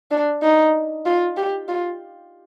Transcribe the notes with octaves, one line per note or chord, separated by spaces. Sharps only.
D4
D#4
F4
G4
F4